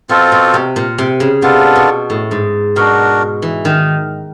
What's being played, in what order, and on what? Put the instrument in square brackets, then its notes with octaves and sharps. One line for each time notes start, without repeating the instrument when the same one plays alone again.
[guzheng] B2 [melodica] C4 F4 A4
[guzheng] B2
C3
A#2
C3
C#3
[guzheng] C3 [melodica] B3 D4 F4 A4
[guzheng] B2
A2
G#2
[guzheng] B2 [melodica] D4 F#4 A#4
[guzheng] E3
D#3